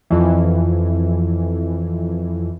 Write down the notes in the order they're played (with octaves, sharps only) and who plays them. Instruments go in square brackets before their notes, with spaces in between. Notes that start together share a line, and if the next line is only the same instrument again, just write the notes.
[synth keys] F2 E3